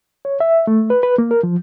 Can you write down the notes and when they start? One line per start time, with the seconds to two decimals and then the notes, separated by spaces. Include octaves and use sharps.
0.25 C#5
0.40 E5
0.67 A3
0.90 B4
1.03 B4
1.18 A#3
1.31 A#4
1.43 F3